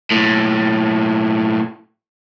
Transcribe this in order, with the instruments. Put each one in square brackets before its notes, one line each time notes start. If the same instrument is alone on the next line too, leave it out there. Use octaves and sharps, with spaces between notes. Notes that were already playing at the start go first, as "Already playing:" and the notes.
[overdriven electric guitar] B1 A2